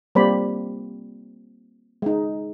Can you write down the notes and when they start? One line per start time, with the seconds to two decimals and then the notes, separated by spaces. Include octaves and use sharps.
0.15 G3 A#3 C4 C5 D5 B5
2.02 G#3 D#4